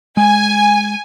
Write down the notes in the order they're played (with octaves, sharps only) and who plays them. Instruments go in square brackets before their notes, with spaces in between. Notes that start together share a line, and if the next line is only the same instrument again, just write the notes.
[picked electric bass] G#3 [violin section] G#5